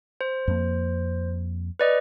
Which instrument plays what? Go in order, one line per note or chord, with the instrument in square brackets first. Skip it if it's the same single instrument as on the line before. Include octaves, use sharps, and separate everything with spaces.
[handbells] C5
[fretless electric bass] F2 A#3
[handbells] B4 D5 D#5